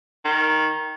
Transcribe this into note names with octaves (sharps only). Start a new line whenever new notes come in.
D#3